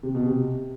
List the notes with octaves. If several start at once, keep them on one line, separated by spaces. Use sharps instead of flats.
C3
B2
C3